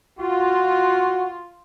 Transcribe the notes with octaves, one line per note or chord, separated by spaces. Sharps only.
F4 F#4